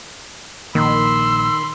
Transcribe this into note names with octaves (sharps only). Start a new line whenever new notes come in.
A#1 D#3 A#3 B5 C6 E6